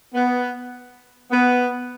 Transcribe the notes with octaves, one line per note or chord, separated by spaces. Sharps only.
B3
B3